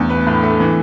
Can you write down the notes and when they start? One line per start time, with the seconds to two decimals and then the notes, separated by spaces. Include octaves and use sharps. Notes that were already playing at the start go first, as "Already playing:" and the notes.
Already playing: E2 A3 B3 D4
0.10 B4
0.27 A2
0.43 A3
0.60 E3